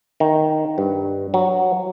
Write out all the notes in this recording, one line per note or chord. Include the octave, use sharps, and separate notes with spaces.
D#3
G2
F#3